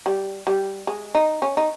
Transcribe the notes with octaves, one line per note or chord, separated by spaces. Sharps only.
G3
G3
G#3
D#4
C#4
D#4